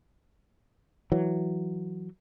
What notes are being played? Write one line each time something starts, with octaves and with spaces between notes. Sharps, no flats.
E3 F#3